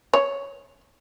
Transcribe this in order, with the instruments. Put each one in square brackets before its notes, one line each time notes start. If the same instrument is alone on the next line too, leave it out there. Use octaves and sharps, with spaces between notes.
[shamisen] C#5